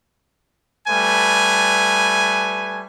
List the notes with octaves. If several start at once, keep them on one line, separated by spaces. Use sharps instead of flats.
G3 A3 B4 G#5